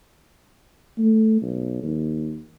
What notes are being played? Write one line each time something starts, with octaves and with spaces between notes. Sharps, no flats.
A3
B1
D#2